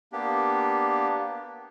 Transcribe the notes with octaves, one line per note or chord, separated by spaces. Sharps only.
A#3 B3 D4 G4